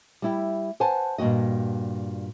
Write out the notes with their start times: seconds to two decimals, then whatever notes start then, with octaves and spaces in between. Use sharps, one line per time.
0.22 G3 E4 G4
0.80 B4 C5 F#5 G#5 A5
1.18 G2 A#2 D#3 F#4 D#5